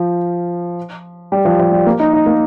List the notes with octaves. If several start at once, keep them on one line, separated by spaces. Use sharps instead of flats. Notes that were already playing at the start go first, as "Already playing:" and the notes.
Already playing: F3
G3
F3
F3
G3
A#3
D#4
D#4
A#3